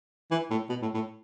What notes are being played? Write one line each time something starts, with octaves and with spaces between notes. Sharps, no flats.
E3
A2
B2
A2
A2